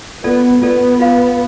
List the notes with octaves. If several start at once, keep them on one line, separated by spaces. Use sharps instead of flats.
B3 F4 A4 D5
B3 F4 A4 D5
F4 B4 F5 B5